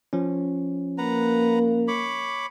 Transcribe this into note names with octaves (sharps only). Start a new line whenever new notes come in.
F3 C#4
A#3 B4 F#5 A#5
C#5 B5 D6